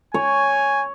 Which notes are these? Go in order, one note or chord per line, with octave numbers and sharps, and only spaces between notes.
C#5 G#5